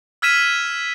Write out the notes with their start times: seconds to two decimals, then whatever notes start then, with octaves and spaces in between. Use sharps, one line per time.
0.22 E6 F6 G#6 B6 D#7 E7